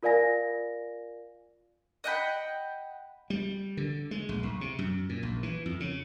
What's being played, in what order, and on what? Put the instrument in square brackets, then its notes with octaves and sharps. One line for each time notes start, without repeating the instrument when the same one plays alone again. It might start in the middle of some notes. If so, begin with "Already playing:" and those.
[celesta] F4 A#4 D5 F5 G#5 A#6
[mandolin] D#5 F#5 G5 B5
[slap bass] G3
D3
G#3
A#1
B1
C3
F#2
A#2
A#1
E3
F2
C#3